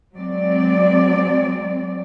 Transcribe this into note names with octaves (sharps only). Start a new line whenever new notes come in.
F#3 G#3 C4 D5